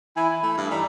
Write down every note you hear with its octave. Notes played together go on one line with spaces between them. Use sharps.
E3 E4 G#5
E4
A3
G2
E3 G3 D#4 E5